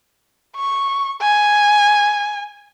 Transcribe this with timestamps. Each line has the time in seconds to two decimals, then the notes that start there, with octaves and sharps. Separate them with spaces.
0.56 C#6
1.22 G#5